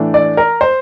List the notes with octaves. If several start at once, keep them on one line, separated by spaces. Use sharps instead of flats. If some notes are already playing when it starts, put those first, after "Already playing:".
Already playing: A2 E3 A3 D4
D5
A#4
C5